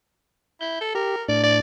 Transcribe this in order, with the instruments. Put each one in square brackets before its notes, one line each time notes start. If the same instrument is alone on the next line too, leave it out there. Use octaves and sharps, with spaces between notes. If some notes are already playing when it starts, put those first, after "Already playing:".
[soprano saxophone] E4 [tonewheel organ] G6
[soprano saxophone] A4
[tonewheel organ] G4 [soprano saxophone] A#4
[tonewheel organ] A2 D4 [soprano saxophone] D5
[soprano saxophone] D5